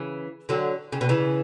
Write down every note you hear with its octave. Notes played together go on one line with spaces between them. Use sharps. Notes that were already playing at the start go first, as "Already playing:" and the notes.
Already playing: C#3 E3
D3 F#3
C#3
B2
C#3 E3